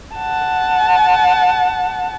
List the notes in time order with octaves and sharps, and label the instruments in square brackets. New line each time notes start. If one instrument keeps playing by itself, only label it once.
[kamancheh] F#5 A5